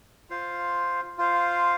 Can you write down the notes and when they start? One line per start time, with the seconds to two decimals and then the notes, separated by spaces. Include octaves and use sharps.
0.30 F4 C5 F5
1.18 F4 C5 F5